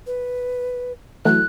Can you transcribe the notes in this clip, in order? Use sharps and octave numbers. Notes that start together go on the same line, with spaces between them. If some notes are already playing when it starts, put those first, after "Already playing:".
B4
E3 F#3 A3 F#6